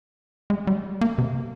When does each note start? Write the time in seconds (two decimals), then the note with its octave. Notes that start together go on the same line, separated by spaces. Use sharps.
0.50 G#3
0.67 G3
1.01 A#3
1.18 C3